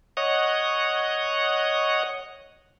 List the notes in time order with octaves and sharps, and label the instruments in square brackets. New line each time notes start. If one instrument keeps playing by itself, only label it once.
[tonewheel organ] C#5 D#5 F#5